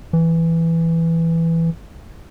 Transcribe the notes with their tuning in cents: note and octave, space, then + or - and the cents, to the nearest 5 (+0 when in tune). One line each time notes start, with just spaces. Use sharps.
E3 +5